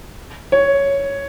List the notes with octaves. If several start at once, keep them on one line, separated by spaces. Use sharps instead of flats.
C#5